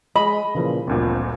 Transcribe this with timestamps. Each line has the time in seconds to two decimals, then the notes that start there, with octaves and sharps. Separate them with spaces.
0.16 G#3 D#5 B5
0.55 A#2 C#3 E3 F3
0.87 G1 D2 A#2 F3 C4